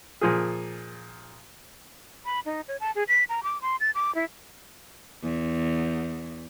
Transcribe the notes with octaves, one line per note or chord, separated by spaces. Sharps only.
A#2 F3 G#4
B5
D#4
C#5
A5
G#4
B6
A#5
D6
C6
A6
D6
E4
E2